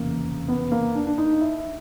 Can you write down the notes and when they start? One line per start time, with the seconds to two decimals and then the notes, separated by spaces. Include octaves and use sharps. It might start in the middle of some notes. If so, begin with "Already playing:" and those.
Already playing: F1 E2 C#3 E3 A#3
0.48 B3
0.72 A#3
0.95 D4
1.07 D4
1.18 D#4
1.41 E4